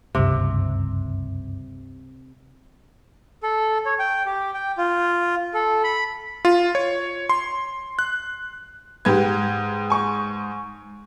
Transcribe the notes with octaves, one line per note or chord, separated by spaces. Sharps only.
F#1 C#2 G2 C3
A4
C#5
G5
G4
G5
F4
A4
B5
F4
C#5
C6
F#6
G#2 G4 B4 G#6
G#5 C#6